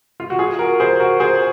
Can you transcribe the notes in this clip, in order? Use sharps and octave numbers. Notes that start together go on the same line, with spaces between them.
F4
F#4
F4 G#4
F#4 A#4
G#4 C5
F#4 A#4
G#4 C5